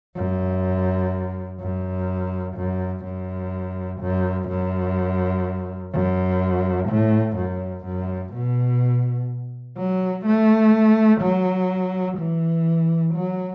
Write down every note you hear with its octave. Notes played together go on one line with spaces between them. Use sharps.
F#2
F#2
F#2
F#2
F#2
F#2
F#2
A2
F#2
F#2
B2
F#3
A3
F#3
E3
F#3